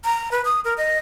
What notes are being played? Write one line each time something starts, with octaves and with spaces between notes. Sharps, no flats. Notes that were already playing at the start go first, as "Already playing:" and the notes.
A#5
B4
D#6
A#4
D#5